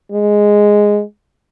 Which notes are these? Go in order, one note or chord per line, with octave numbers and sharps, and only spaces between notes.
G#3